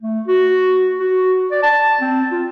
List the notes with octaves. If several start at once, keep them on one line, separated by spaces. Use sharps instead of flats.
A3
F#4
F#4
D5
A5
C4
F4